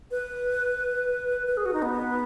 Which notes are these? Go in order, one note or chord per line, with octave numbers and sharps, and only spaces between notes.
B4
B4
G#4
F#4
D#4
B3